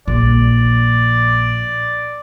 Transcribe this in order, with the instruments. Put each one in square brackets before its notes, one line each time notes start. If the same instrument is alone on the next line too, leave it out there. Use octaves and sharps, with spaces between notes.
[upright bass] A#1 [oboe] D5